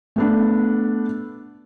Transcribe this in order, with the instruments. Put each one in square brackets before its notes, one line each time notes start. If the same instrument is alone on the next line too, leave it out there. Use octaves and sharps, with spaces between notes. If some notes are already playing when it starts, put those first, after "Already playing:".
[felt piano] A3 B3 D4